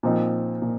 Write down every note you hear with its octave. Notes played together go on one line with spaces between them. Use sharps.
A#2 F3 C4 D#4
A#2